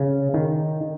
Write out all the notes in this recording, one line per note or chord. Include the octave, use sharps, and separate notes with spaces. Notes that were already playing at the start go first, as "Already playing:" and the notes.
Already playing: C#3
D#3